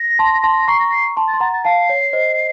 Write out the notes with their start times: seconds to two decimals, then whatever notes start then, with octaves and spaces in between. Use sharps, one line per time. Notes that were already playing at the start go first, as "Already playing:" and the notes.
Already playing: A#6
0.19 A5 C6
0.43 A5 C6
0.58 A#6
0.68 A#5 C#6 C7
0.80 A#6
0.92 C7
1.17 A5 C6
1.28 A6
1.34 C6
1.40 F#5 A#5 A6
1.53 A6
1.65 F5 A5 C7
1.89 C#5
2.13 C5 D#5